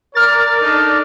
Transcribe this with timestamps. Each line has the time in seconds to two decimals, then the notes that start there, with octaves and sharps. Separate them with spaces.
0.15 A#4 D5 F6 A6
0.61 D4 D#4 A4